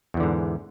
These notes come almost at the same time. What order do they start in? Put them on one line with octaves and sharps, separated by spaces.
E2 E3 D3 G#2